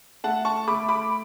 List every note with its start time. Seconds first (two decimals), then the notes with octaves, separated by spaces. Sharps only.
0.24 A3 F#5 A5
0.45 A5 C#6
0.67 A3 B5 D6
0.89 B5 D6